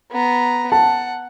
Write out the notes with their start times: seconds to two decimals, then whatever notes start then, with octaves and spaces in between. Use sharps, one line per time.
0.12 B3 A#5
0.72 F#5 A5